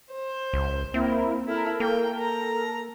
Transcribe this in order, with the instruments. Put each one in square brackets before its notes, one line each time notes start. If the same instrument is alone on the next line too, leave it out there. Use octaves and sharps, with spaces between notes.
[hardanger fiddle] C5
[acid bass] C#2
[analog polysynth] A#3 E4 A#4 [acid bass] C4
[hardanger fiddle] E4 [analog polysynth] A4 A#4
[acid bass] A#3 [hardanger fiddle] G5
[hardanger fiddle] A#5